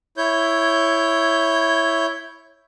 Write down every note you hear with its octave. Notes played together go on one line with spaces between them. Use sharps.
E4 C#5 G6